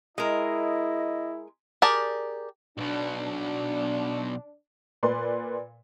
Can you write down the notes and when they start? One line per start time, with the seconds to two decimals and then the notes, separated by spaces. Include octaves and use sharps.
0.18 G#3 E4 A#4 D#5
1.82 G4 G#4 A#4 D5 A5
2.78 B1 B2 D4
5.03 A#2 B4 D5 C6